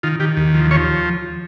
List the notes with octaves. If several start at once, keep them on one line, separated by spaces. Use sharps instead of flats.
D#3 F4
D#3 G4
D#2
F3
F3 C#5